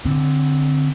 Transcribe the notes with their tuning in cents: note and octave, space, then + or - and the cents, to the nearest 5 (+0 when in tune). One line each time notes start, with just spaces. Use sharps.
D3 +0 C4 +0